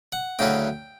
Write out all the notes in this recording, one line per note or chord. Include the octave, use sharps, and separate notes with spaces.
F#5
D2 C#3 F#3 C#4 E4 G5